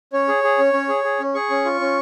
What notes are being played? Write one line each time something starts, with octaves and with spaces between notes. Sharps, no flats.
C#4 C#5
G#4
G#4
C#4
C#4
G#4
G#4
C#4
G#4 C#6
C#4
F4
C#4